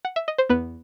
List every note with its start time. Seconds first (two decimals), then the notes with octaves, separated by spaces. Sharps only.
0.05 F#5
0.16 E5
0.28 D#5
0.38 C5
0.49 E2 B3 B4